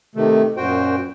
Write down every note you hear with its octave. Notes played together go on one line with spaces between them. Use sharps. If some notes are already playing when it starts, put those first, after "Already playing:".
C3 D#3 A3
F#2 A#2 F#4 C5 G5